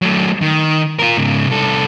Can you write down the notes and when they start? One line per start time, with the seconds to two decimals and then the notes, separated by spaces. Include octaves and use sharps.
0.02 F#3 A3
0.42 D#3
0.99 F4 A#4
1.17 G#2 C#3
1.48 C2 A4